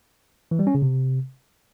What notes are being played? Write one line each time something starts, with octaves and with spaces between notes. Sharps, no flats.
E3
G3
C#4
C#3
C3